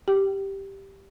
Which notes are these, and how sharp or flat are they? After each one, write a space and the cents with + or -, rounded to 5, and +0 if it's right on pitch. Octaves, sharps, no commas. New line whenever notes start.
G4 +0 G5 -25